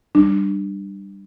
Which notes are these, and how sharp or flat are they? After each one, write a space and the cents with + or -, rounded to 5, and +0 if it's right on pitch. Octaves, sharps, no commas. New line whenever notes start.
G3 +0 D4 +20